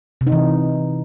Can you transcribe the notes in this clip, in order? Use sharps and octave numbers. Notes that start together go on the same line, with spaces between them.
C3
D#4
E3